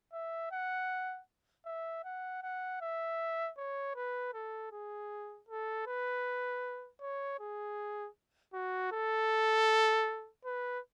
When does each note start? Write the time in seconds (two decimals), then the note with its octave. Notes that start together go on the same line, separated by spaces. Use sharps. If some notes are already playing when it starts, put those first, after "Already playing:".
0.13 E5
0.52 F#5
1.66 E5
2.05 F#5
2.43 F#5
2.81 E5
3.58 C#5
3.96 B4
4.34 A4
4.72 G#4
5.49 A4
5.86 B4
7.01 C#5
7.40 G#4
8.54 F#4
8.92 A4
10.45 B4